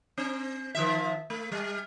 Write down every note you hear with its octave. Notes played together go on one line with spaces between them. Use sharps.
C4
D#3 F3 E5
A3
G3